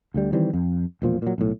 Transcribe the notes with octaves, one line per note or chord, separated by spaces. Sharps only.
D2 D3 G3
D#3 E3 G3 C4
F2
E1 A#2 F3
A#2 F#3
B1 A2